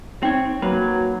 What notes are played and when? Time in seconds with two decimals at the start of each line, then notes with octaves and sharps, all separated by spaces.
0.23 C4 D#4 C#5 G5
0.62 F#3 A#3 F#4 B4